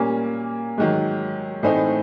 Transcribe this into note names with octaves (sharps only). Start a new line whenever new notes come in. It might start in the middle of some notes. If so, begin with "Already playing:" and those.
Already playing: A#2 G3 A#3 C#4
G#2 D#3 F#3
A2 E3 A3 C4 D#4